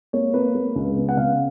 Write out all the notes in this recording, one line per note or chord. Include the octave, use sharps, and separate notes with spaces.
A#3 C#5
A#3 B4
A#3
C#2
B3
F#5
C#3 F5